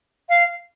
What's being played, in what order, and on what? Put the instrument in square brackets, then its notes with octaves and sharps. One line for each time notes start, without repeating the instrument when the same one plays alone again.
[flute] F5